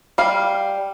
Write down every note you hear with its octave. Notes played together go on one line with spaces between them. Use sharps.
G3 F5